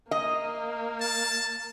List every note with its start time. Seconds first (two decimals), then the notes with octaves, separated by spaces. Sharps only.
0.11 A#3 D#5
1.01 A5